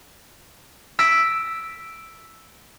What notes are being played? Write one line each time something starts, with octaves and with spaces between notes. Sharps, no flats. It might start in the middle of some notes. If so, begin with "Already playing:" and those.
E6 A#6 B6 D7